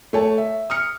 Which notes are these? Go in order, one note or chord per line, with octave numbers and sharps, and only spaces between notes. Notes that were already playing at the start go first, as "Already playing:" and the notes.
A3 C#5 A5
E5
D#6 F6 C#7